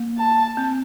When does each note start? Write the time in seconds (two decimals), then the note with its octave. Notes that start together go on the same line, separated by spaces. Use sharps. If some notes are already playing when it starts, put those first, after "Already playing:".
Already playing: A#3
0.18 A5
0.57 C4